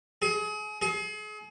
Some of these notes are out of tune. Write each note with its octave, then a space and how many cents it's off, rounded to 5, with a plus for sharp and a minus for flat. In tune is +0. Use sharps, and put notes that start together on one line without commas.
G#4 +35
G#4 +40